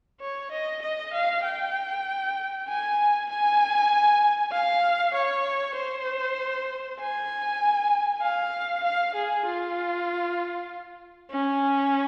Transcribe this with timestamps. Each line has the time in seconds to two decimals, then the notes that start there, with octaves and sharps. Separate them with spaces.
0.21 C#5
0.52 D#5
0.82 D#5
1.14 F5
1.44 G5
2.68 G#5
3.29 G#5
4.52 F5
5.14 C#5
5.76 C5
6.99 G#5
8.22 F5
8.84 F5
9.15 G#4
9.46 F4
11.31 C#4